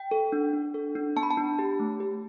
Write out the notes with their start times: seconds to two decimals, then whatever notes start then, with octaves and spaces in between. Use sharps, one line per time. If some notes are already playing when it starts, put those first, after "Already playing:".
Already playing: G5
0.11 A4
0.32 D4
0.53 D4
0.74 A4
0.95 D4
1.16 B3 A5
1.23 B5
1.31 A5
1.38 D4
1.59 G4
1.80 A3
2.00 G4